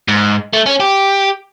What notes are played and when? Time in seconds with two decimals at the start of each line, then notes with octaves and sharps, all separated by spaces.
0.08 G#2
0.53 A3
0.66 C#4
0.80 G4